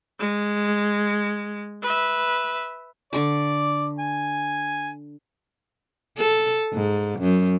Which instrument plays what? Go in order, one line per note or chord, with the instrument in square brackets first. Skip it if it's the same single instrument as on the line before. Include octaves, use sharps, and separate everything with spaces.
[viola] G#3
B4 E5
[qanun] D3 C#6 D6 [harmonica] D5
[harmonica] G#5
[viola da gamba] A4
G#2
F#2